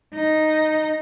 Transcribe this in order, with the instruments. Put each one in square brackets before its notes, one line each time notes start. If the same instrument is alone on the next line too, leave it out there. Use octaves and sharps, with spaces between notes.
[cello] D#4